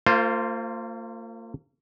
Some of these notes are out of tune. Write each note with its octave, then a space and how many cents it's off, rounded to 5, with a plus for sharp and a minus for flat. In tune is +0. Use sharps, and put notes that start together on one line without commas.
A#3 -40 F4 +0 C5 +0